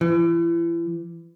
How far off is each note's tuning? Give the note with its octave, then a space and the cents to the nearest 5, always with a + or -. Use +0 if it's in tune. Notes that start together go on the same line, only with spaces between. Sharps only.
E3 +35